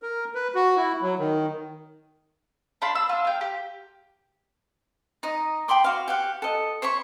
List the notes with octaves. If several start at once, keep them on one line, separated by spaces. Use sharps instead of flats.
A#4
B4
F#4
E4
F#3
D#3
D4 F5 B5 C6
E6
D4 F4
F5 G5
G4
D#4 D#5
G5 B5 C6 D6
F#4 F5
G4 F5 F#5
A4 D#5
C5 C#5 B5 C#6